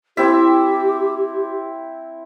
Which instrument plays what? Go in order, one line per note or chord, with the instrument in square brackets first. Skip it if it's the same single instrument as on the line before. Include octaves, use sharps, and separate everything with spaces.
[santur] C4 E4 E5 [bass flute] G4